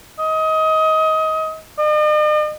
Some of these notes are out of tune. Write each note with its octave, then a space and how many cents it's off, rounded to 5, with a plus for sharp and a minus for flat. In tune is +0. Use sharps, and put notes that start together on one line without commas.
D#5 +25
D#5 -45